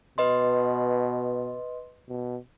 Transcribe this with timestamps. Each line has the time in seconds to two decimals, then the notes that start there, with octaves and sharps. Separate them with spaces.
0.18 B2 B4 D#5 C6
2.09 B2